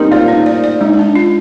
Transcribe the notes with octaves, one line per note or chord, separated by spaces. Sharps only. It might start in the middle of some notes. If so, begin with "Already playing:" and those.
Already playing: G3 A#3 C4 D#4 A#4
F4 D5
D#4
D5
D5
G#3 D#4
D4
F4